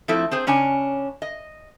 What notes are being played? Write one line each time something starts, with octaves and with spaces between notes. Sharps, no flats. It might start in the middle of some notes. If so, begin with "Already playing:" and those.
F3 A3 C4 E4
C4 G#4 C5
C#3 C#4 D4 G#5
D#5